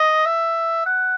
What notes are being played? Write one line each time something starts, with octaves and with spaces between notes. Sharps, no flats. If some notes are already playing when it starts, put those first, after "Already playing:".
Already playing: D#5
E5
F#5